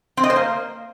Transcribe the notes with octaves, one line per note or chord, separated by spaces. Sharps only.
C4
D#5
C5
A#3